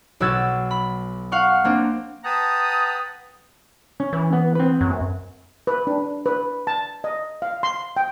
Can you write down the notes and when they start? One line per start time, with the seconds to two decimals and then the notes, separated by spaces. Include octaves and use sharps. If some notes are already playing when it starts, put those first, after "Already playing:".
0.20 B1 B2 F#4 E6 G#6 A6
0.71 B5
1.32 F5 F#5 C#6
1.64 A#3 C4 D4
2.24 B4 F#5 G5 A5 A#5 D#6
4.00 C#4
4.13 E3
4.33 B3
4.55 C4 B4
4.81 F#2
5.67 B4
5.87 D4
6.26 B4
6.67 A5
7.04 D#5
7.42 F5
7.63 C6
7.97 G5